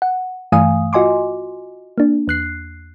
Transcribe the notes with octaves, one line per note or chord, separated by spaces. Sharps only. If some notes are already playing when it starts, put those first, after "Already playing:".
F#5
G2 E3 A3 F5 G#5 D#6
F4 F#4 D#5 G#5 C6 D6
A#3 D4
E2 F#6 C7